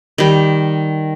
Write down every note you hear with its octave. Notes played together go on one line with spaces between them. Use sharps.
D#3 G3